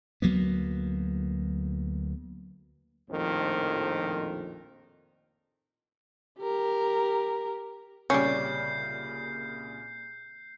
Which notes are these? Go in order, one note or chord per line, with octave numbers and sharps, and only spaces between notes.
D2 F#3 A#3 B3
A#1 F2 A2 D#3 C5
G4 A#4
C2 A#2 C#3 G3 C#4 G6 C7